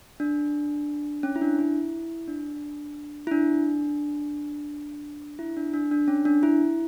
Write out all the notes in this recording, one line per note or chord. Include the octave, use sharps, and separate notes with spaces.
D4
C#4
E4
D4
E4
D4
E4
D4
E4
D4
D4
D4
C#4
D4
E4